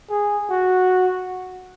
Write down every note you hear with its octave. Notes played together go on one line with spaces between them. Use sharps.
G#4
F#4